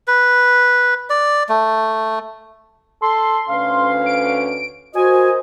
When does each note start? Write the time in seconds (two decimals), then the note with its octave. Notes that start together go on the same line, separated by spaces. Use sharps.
0.07 B4
1.10 D5
1.49 A3
3.02 A4 C6
3.49 D2 C#4 B4 F5
4.06 D7
4.95 F#4 A#4 C5 D#5 G#5